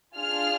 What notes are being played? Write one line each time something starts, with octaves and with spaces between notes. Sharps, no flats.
D4 F4 G#4 F6